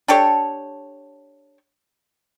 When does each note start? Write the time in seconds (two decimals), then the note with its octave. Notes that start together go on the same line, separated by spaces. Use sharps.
0.08 D4 G4 A4 C#5